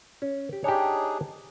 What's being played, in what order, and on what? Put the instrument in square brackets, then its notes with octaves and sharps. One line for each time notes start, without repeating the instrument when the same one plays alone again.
[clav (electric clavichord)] C#4
G4
[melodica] D4 D#4 G#4 [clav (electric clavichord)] G4 C#5